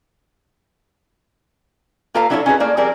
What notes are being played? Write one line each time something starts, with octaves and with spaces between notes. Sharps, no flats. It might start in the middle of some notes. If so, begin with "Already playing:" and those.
A#3 F4 A4 B4 F5 A#5
F#3 D4 E4 F4 A4 C#5
C#4 D#4 F4 F#4 G#4 B4
A3 A#3 D5
F3 G3 C4 G#4 A#4 D5